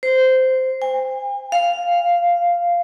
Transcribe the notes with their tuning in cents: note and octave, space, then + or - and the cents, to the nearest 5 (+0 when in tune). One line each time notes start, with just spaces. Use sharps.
C5 -10
G#5 -45
F5 -5